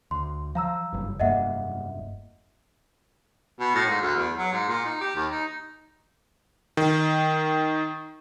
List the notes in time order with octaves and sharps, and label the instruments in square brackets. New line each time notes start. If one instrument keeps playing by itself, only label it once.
[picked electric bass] D2 [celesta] C6
[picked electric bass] F3 [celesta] F5 A#5 E6
[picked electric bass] F#1 G2
[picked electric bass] F1 G2 A#3 [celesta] D#5 E5 F#5
[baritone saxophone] B2
A2
G#2
D2
E2
F#3
G#2
A#2
D#4
G4
D#2
D#4
[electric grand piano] D#3